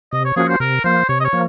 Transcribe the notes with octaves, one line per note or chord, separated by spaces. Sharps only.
C3 D#5
C#5
F3 A#3 C#4 F#4 G#4
C5
C3 A#4
F3 A#3 C5
C3 C#5
D#5
C#5
F3 A#3